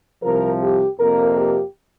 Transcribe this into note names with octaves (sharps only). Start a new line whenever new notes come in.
C2 C3 F3 A#4
G4
F2 C3 A#3 A#4
G4